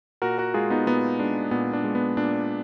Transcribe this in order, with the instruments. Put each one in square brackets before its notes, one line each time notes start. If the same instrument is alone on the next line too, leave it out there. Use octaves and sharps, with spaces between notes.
[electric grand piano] A#2 F#4 A#4
F#4 A#4
G#3 F4 G#4
B3 D#4
A#2 B3 D#4
G#3 D4
A#2 B3
D4
G#3
B3
A#2 D4